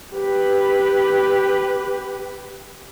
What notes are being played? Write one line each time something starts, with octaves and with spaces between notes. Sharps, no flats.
G4 B4